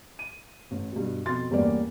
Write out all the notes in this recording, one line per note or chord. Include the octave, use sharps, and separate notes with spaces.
D#7
A1
G2 B2
F2 B2 C6 A6
A1 E2 G3 A#3 D5